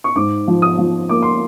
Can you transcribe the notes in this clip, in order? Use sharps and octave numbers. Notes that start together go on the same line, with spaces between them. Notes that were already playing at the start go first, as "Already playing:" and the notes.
C#6
G#2 D6
F3
D#6
F3
A#3 D6
C6